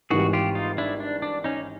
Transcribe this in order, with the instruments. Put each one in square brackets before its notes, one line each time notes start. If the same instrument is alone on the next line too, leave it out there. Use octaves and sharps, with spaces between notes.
[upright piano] G#1 G#2 E3 G3 [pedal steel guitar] F#4 G#4
[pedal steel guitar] F4 G4
D#4 F4
D4 E4
D4
D4
C#4 D#4